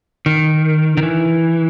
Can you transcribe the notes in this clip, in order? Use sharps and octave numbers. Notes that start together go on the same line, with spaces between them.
D#3
D#3
E3